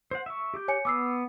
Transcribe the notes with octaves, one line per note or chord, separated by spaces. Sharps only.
C5 F#5
E5 C#6
G4 D6 G6
C#5 G#5 C#7
B3 D6 E6 C7